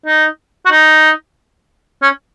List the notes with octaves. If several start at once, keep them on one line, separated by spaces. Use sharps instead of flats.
D#4
F#4
D#4
C#4